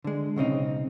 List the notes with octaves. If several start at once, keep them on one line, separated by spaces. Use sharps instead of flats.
D3 G#3
B1 C#3 C4 D#4